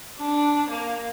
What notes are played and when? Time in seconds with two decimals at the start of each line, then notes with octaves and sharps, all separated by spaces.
0.19 D4
0.70 A#3